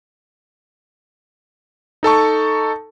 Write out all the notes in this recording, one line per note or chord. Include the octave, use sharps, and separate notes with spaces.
D#4 A4 A5 C#6